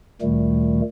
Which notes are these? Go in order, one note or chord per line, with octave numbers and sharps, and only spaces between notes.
D2 A#2 D#3 G3 A3